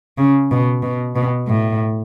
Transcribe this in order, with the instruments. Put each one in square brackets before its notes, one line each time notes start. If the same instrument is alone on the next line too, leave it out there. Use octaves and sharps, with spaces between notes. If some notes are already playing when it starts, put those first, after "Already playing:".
[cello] C#3
B2
B2
B2
A2